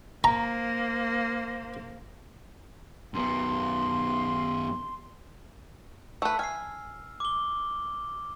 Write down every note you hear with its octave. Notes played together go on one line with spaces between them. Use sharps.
A#3 C5 A#5
F#2 B3 C6
A3 B4 E6
G#5 F6 C7
D6 G7